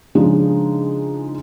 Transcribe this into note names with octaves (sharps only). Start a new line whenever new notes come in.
C#3 F3 G#3 D4 D#4